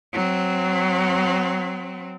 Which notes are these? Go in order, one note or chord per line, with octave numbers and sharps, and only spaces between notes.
F#3 C4